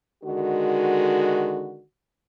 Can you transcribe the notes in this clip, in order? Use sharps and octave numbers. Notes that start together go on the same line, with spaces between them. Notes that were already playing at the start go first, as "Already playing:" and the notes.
D3 D#3 G#3 F#4